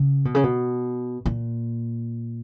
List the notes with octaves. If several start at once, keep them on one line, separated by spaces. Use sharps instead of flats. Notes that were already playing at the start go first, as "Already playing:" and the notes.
Already playing: C#3
B2
C#3
B2
A#2